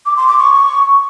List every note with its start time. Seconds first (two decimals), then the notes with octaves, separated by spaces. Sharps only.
0.06 D6
0.17 C6
0.28 D6
0.39 C#6